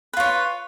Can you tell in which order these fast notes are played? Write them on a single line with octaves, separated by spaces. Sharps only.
B4 F4 C#5